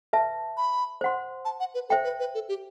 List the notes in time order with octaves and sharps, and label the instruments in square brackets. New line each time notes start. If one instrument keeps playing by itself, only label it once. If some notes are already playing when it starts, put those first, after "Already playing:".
[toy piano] B4 E5 A5
[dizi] B5
[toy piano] C5 F#5 C6
[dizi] A5
F#5
B4
[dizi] A4 [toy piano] C5 E5 G5
[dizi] B4
B4
A4
G4